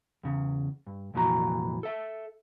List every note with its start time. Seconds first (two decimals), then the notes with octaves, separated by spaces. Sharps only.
0.24 E2 C#3
0.87 G2
1.14 C2 F2 A#2 E3 F#4 A#5
1.83 A4 E5